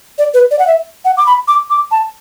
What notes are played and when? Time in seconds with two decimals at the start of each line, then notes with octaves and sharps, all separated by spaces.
0.18 D5
0.34 B4
0.51 D5
0.59 F#5
0.67 E5
1.05 F#5
1.17 D6
1.27 B5
1.48 D6
1.70 D6
1.91 A5